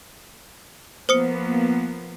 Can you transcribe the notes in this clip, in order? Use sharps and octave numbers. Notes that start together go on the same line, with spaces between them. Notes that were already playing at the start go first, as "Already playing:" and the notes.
F3 A#3 B3 C5 D#6 C#7